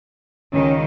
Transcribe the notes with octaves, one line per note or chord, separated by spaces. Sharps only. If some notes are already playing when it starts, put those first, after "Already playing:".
C#2 D#3 C#4